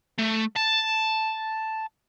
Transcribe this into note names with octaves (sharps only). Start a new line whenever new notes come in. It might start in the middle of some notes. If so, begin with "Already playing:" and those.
A3
A5